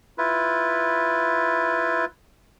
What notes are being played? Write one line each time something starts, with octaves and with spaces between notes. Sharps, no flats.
E4 F4 B4